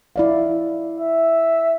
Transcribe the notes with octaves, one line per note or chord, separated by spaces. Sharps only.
E4 D5 F5
E5